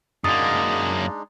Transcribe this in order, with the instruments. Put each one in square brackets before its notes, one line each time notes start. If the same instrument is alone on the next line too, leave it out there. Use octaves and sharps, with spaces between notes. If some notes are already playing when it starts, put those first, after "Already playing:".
[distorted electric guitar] F#2 A#3 [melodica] G#3 D4 D#4 [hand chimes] D#6 A6